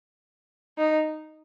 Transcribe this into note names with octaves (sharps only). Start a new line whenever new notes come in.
D#4